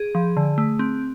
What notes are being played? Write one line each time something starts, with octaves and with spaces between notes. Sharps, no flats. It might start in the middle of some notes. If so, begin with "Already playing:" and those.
Already playing: G#4
F3
D3
A3
C4